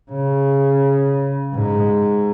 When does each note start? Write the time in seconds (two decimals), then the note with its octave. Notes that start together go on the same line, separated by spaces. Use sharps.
0.12 C#3
1.54 G#2